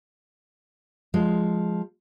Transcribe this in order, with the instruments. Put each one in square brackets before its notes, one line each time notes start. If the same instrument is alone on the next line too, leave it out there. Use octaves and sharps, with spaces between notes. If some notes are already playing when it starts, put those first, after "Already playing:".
[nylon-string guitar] F3 G#3